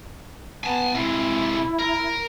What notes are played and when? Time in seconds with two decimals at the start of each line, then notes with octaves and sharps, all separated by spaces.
0.64 B3 G#5 A5
0.95 C3 G#3 E4
1.79 A#4